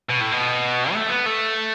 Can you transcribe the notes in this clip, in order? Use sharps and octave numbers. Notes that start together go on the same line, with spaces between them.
B2
A2
B2
A3
B3
A3